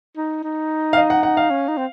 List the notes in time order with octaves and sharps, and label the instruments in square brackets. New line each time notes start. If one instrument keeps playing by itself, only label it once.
[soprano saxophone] D#4
D#4
[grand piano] F5
D#5
F#5
F#5
F5
[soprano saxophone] C#4
D#4
C4